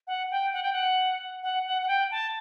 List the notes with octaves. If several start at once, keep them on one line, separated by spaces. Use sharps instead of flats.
F#5
G5
F#5
G5
F#5
F#5
F#5
F#5
G5
A5